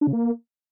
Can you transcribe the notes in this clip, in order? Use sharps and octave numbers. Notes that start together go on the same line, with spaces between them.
D4
C#3
A#3